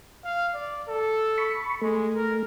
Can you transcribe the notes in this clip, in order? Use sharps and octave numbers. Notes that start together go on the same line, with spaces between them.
F5
D5
A4
B5 C#6
G#3 A3
A#4